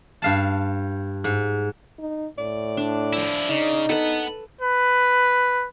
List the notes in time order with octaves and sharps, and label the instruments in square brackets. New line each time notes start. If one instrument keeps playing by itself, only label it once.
[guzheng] G2 F5 A5
G#2
[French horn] D#4
[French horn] A2 [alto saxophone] D5
[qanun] D4
[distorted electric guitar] F3 E4
[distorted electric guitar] C#3 [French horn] D#4
[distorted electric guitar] B3 F#5 [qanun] A4 B4
[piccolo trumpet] B4